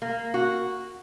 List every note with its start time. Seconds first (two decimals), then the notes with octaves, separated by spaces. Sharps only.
0.02 A#3
0.34 F#4